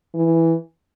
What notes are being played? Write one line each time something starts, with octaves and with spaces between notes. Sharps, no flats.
E3